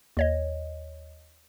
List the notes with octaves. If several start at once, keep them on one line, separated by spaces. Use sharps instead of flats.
D#2 C#5 D#5